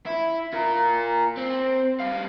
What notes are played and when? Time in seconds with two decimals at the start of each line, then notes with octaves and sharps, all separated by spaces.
0.06 E4
0.53 F4 A#4
1.37 C4
2.00 G3 F5